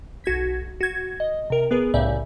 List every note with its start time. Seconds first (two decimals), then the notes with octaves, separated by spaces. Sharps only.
0.24 B1 F#4 G#6 B6
0.81 F#4 G#6
1.20 D#5
1.50 C3 A#4
1.71 B3 G#4 A#4 B4
1.94 C2 A2 C#3 D5 E5 G6